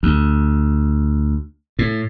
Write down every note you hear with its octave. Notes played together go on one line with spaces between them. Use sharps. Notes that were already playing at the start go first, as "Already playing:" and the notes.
D2
A2